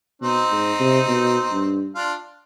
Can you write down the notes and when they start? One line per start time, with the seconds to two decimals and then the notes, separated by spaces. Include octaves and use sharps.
0.21 B2 C4 D#4
0.51 G#2
0.80 C3
1.08 B2
1.52 G2
1.95 D4 F4